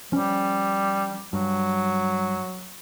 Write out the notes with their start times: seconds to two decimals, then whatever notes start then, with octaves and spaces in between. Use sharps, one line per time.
0.12 F3 G3 C#4
1.33 G2 F#3